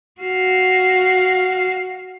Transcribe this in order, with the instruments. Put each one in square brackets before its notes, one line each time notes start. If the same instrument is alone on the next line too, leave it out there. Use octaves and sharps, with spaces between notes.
[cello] F#4 F5